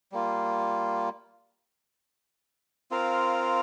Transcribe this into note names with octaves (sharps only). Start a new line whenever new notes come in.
G3 A#3 F4
C4 F4 A#4 F5